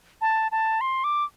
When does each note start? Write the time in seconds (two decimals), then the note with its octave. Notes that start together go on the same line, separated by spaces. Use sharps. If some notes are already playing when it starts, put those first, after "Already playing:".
0.21 A5
0.52 A5
0.81 C6
1.04 D6